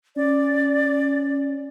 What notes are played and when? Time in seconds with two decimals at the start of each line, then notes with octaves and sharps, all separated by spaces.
0.16 C#4 D5